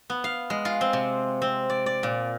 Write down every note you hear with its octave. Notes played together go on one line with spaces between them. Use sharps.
B3
F5
G#3
F4
C4
C3
C4
D5
D5
A#2